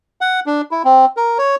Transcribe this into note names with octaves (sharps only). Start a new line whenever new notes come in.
F#5
D4
E4
C4
A#4
C#5